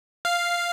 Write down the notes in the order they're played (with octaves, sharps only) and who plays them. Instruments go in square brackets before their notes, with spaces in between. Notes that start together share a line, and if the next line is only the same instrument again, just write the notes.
[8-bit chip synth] F5